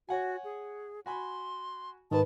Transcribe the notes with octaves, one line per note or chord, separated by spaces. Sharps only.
F#4 C#5 F#5 G#5
G#4
F#4 G#5 B5 C6
G#2 D#3 B4 A5